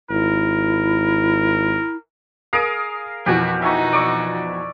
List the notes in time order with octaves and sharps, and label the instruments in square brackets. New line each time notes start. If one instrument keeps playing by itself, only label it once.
[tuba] G#1 [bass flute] E4 [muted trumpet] A#4
[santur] G#4 A#4 F5 [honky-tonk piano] D#6 D7
[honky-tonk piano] F2 B2 E3 [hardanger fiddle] F#4 [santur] G4 G#5
[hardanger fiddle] D#4 F#4 [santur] E5 G#5 C#6
[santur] D5 C#6 E6